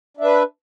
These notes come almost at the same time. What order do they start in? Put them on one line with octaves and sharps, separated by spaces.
D4 E5 B4